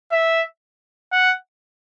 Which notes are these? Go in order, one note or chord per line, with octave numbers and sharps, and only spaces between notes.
E5
F#5